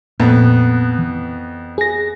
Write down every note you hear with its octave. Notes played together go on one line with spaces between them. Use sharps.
F2 A#2 B3
E3
G#4 A#6